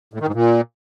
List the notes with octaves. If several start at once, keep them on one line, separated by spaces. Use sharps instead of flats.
A2
D#3
G#2
A#2